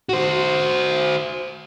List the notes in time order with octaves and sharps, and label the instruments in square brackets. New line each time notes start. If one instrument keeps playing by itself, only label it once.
[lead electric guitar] F#4 C5